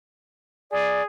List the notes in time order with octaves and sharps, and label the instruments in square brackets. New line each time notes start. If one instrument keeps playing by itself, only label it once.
[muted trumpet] G#4 [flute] D5